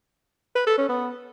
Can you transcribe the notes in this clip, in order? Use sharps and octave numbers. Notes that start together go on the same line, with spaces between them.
B4
A4
C#4
B3